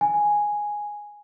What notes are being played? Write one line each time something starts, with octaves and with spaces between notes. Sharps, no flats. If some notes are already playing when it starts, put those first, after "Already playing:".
G#5